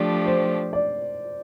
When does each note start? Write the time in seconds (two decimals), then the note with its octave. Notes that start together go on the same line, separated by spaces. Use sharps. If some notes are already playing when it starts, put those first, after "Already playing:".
Already playing: F3 A3 D4 G4 D5
0.26 C5
0.73 D5